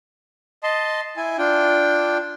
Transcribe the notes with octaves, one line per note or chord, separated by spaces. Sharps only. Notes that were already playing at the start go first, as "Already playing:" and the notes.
D#5 A5 C6
E4 G#5
D4 F4 G5